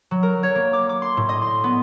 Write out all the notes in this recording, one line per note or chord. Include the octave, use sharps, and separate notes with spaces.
F#3
A#4
C#5
A#3
D6
D6
C6
A2
D#5
C6
B3